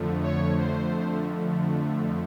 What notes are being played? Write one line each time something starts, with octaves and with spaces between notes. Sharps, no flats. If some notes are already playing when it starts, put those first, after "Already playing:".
Already playing: F2 D3 F3 A3
C#5
C5